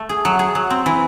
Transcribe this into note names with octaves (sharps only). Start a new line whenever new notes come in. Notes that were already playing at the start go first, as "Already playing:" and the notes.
Already playing: A3
G#4
F#3
G#4
F#3
C4
E3